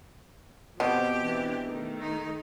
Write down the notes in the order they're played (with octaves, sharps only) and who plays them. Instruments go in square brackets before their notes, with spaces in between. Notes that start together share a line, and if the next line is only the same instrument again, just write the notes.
[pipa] B2 [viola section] F3 C4 [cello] G4
[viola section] E3 C4 D4
D#3 A3
[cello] D#4